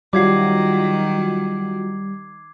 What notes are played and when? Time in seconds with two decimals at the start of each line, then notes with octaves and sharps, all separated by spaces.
0.13 D#3 F#3 G3 F4 F#4 D6 G#6 C7